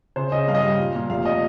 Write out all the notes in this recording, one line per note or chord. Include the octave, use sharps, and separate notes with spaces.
C#3 C5
C#3 D#5
G2 F5
D#5
G3 F5
A#2
A#2
F1 F5
D#5